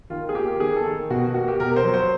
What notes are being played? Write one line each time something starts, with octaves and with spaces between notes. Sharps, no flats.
D#3 F4
G#4
A#3 G4
D#3 G#4
A4
D#3
B2 F#4
A#3 F#4
G4
B2 A#4
C5
F#3
C5